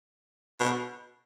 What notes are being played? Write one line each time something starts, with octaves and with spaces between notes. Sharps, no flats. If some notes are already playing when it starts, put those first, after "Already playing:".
B2